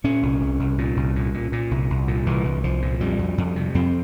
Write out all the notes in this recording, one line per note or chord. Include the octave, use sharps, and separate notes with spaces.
A#2 C#4
C2
C2
C2
A#2
C2
A#2
A#2
A#2
C2
C2
A#2
C2 E3
C2
C2 F3
A#2
F2 G3
F2
F2
C3
F2 C4